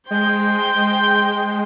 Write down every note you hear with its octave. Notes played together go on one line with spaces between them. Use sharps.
G#3 C5 G5 G6